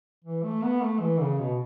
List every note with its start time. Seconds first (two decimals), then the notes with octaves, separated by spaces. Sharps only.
0.24 E3
0.43 A3
0.62 B3
0.81 A3
1.00 E3
1.20 C#3
1.39 B2